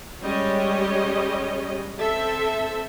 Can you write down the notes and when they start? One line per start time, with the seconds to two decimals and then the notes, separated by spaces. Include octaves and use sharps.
0.22 G3 G#3 C#4 G4 C#5 D#5
1.99 C4 A4 E5